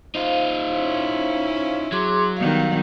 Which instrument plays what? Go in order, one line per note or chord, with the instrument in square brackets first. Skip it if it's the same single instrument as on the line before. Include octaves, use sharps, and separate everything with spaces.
[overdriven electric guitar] D#4 F4 [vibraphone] C5 F5
[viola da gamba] C#4 E4
[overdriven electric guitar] F#3 [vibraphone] G#4 C6 D6
[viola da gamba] D#3 G3 B3 [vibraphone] F5